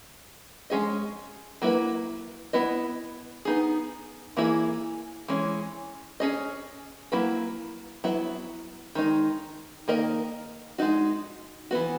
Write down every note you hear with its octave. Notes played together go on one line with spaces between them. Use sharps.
G#3 C#4 G#4 D#5
F#3 A#3 E4 B4
B3 E4 B4 D#5
B3 D#4 G#4
E3 A#3 E4 G#4
E3 G#3 C#4
C#4 G#4 D#5
F#3 A#3 E4 B4
F#3 B3 E4
D#3 G#3 D#4
D#3 A#3 D#4 A#4 D#5
G#3 D#4 F#4
E3 B3 F#4